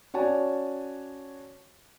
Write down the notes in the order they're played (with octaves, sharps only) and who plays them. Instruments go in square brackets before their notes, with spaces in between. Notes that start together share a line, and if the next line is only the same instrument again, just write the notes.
[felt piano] C#4 F#4 C#5 D5 G#5 A5